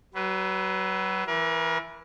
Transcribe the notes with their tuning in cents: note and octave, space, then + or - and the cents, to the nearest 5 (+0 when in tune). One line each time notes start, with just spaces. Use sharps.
F#3 +35 B4 +0
E3 +10 A#4 +40